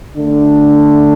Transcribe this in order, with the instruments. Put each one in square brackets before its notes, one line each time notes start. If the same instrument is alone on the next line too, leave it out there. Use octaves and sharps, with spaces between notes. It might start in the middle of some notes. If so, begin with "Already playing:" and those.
[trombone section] D3 A3 D4